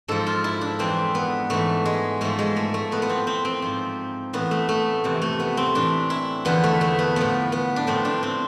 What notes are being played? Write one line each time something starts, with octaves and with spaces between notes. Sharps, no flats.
G#2 F3 A4
F4
E4
D4
F2 E3 C4
B3
G#2 E3 A3
G#3
G#2 F3 A3
G#3
A3
A3
A2 B3
F3
B3
C4
C4
C4
G#2 F3
A2 E3 B3
A3
A3
F2 C3 E3
A3
B3
C4
A2 E3 D4
E4
E2 D3 F3 B3
A3
A3
B3
A2 F3 B3
B3
D4
A2 F3 C4
D4
C4